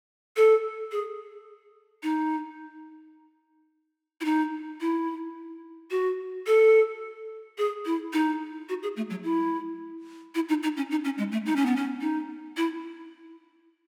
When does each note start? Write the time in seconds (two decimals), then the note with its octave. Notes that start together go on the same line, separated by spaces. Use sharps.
0.37 A4
0.92 G#4
2.03 D#4
4.21 E4
4.25 D#4
4.81 E4
5.91 F#4
6.47 A4
7.58 G#4
7.85 E4
8.13 D#4
8.69 F#4
8.83 G#4
8.96 A3
9.10 F#3
9.24 E4
10.35 E4
10.49 D#4
10.63 D#4
10.77 C#4
10.91 D#4
11.05 C#4
11.18 G#3
11.32 A3
11.46 D#4
11.56 C#4
11.66 B3
11.76 C#4
12.01 D#4
12.57 E4